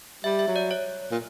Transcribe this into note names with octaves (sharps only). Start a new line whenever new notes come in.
G3 E5
E5
F#3
D5
C#5
A#2